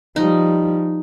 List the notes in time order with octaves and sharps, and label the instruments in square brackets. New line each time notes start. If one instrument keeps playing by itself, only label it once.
[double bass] F3 G3 [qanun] D#4